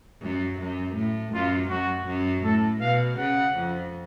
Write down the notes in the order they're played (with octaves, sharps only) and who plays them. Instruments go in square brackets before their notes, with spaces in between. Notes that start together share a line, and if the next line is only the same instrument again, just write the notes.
[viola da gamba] F#2
F#2
A2
[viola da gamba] F#2 [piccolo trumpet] F4
[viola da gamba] F#2 [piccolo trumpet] F#4
[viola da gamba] F#2
[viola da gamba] A2 [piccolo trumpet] A4
[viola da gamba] B2 [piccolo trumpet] F5
[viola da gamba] C#3 [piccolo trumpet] F#5
[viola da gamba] F2